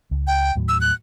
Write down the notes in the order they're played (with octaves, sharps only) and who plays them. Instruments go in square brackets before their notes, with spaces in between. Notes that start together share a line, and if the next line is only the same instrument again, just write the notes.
[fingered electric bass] C#2
[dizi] G5
[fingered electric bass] D#2 A2 F#3
[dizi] E6
F#6